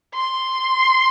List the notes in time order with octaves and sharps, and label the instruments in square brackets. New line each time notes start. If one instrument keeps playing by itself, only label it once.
[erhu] C6